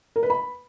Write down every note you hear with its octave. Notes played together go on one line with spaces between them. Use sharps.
A#4
B4
B5